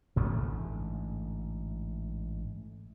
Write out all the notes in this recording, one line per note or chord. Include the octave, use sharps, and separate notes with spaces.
A1 G#2 D3 A3